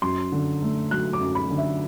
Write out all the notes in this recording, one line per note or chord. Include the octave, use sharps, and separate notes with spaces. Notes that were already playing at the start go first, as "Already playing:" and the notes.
F#2 C6
D3
A3
F#3 F#6
D6
F#2
B5
D3
E5